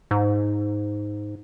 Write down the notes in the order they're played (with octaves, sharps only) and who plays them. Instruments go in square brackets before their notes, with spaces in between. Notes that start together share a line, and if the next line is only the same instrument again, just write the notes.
[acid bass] G#2